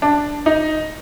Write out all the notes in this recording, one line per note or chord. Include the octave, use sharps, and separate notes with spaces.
D4
D#4